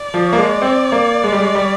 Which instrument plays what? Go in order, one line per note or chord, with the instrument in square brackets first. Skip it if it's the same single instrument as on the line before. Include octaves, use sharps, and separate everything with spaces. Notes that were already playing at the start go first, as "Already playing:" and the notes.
Already playing: [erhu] D5
[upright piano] F3
A#3
G#3
C4
A#3
G#3
G3
G#3
G3